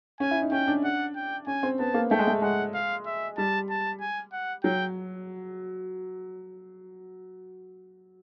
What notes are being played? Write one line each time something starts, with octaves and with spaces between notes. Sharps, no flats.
C#4 G#5
E4
D#4
C#4 G5
D4
F#5
G5
C#4 G#5
C4
B3 A5
A#3
A3 G5
G#3
A3
G#3 F#5
F5
E5
G3 A5
A5
G#5
F#5
F#3 G5